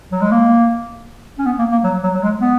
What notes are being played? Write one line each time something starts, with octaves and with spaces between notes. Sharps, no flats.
F#3
G#3
A#3
C#4
B3
A#3
A#3
F#3
F#3
F#3
G#3
B3